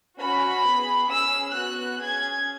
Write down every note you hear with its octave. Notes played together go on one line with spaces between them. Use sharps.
C#4 F#4 B5
B3 G#4
C#4 G#4 E6
B3 F#4 F#6
C#4 G#4 G#6